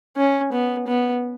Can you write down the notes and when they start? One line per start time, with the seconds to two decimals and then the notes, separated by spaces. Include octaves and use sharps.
0.17 C#4
0.52 B3
0.87 B3